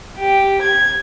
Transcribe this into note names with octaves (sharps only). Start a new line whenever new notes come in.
G4
G#6